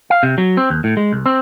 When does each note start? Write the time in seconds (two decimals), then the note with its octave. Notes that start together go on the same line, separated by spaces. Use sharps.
0.10 F5
0.23 C3
0.38 F#3
0.57 C4
0.70 D#2
0.84 A2
0.97 G#3
1.13 C2
1.26 C4